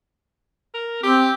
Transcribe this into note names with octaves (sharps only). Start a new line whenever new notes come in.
A#4
C4 G4